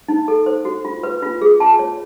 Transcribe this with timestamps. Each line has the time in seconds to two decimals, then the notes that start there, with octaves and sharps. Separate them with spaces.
0.08 D#4
0.28 A4
0.46 C5
0.65 F#4
0.85 F4
1.03 B4
1.23 F4
1.41 G#4
1.60 F4 A5
1.79 C#5